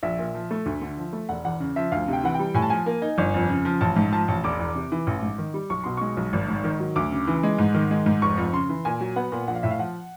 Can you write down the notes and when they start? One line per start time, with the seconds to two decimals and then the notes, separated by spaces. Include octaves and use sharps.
0.03 A#1 E5
0.19 A#2
0.35 F3
0.51 A3
0.66 D2
0.82 D3
0.97 F3
1.13 A3
1.29 E1 F#5
1.45 E2 F#5
1.60 C#3
1.76 F3 E5
1.92 D2 F5
2.08 C3 G5
2.24 E3 F#5
2.34 G3 G5
2.54 A2 G#5
2.62 A5
2.70 F3 G#5
2.86 A#3
3.02 D#4
3.18 G1
3.34 F2
3.50 C#3
3.65 F3
3.81 A1 A5
3.96 G#2
4.12 F3 A5
4.28 A1
4.44 E1 D6
4.59 E2
4.75 C3
4.92 E3
5.07 A1
5.23 G#2
5.38 D#3
5.54 G3
5.70 B1 C#6
5.84 B2 C6
5.97 G#3 C#6
6.17 B1
6.33 G#1
6.49 G#2
6.64 D#3
6.80 F#3
6.96 D2 D6
7.12 C#3
7.27 E3
7.43 G#3
7.59 G#2
7.74 D#3
7.91 G#3
8.06 G#2
8.22 F1 C#6
8.37 F2
8.53 C#3 C6
8.69 E3
8.85 A#2 G#5
9.01 F#3
9.16 B3 F#5
9.32 A#2
9.48 A#1 F#5
9.55 F5
9.63 A2 E5
9.71 F5
9.79 F3 F#5